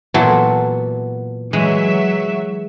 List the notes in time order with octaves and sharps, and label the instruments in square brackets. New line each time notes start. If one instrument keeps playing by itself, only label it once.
[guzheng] A#2 E3 A4 [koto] F#3 [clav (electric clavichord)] B3 E4 F#4
[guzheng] E3 [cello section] F#3 E5 [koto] G#3